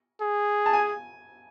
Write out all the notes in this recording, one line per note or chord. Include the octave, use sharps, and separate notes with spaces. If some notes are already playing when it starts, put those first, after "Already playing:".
G#4
A5
G#5